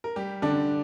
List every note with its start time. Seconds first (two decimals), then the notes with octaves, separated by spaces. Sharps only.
0.04 A#4
0.16 G3 G4
0.42 D3 D4